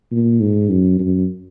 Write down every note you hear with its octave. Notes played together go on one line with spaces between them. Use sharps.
A#2
G#2
F#2
F#2